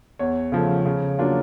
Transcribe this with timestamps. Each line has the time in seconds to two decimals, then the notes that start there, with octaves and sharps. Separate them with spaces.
0.19 E2 C#5
0.52 C#3 F3 A3
0.86 C#3
1.19 F#3 A#3 D4 F4